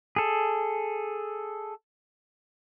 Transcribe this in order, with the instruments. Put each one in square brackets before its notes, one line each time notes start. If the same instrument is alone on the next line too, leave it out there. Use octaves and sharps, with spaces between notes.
[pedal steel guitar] G#4 A4